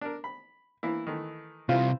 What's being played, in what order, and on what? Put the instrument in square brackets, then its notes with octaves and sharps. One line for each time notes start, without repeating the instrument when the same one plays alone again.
[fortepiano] D4 A#4
B5
E3 A#3 E4
D#3 E3 A3
[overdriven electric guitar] C2 C3 [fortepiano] E3 C5 [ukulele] F4